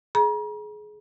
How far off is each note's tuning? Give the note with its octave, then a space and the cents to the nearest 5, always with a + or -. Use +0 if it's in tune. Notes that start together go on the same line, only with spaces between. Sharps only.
G#4 +25 A#5 +40